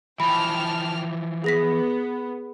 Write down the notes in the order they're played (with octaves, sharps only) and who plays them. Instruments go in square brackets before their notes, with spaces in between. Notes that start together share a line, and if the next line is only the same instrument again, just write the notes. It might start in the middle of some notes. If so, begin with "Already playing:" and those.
[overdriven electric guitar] E3 F3 [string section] G5 A5 F6 [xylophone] B5
[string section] B3 [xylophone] G#4 A#6 B6